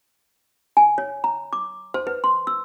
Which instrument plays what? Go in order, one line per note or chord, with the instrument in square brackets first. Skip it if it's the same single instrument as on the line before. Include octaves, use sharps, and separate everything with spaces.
[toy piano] G#5
C#5
A#5
D6
C5
B4
C6
E6